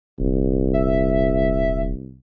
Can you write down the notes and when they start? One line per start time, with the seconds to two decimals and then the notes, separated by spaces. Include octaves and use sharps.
0.19 D#1 C2
0.74 E5